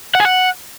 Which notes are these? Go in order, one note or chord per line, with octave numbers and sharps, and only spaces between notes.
F#5
G#4
F#5